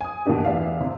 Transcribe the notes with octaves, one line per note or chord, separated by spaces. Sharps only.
G#5 D#6
B2 E3 A#3 D4 G4
E2 D5 E5 F5
C3